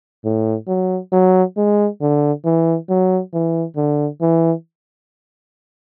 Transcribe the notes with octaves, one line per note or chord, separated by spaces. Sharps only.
A2
F#3
F#3
G#3
D3
E3
F#3
E3
D3
E3